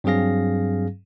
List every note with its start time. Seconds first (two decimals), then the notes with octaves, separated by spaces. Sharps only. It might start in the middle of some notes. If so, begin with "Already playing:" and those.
0.04 G2 F#3 C4 G#4 F5 A#6